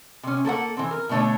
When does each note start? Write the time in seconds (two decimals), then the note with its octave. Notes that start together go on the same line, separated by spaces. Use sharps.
0.23 C3 C#4
0.45 A#3 A4 B4 F#5
0.77 E3 C4
0.91 A#4
1.09 B2 D3 A3 D4 C#5